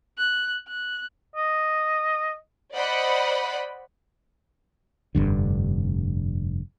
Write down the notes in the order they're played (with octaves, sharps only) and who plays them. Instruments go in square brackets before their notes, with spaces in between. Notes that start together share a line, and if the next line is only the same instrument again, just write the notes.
[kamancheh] F#6
F#6
[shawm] D#5
[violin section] C5 D5 D#5 F#5 B5
[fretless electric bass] F1 A#1 G2 D3